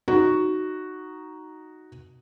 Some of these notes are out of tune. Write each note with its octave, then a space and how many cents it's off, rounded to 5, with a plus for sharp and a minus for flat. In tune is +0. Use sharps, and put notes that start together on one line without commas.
D#4 +0 F#4 +0